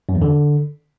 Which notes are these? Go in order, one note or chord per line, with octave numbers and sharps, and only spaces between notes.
F#2
E2
D3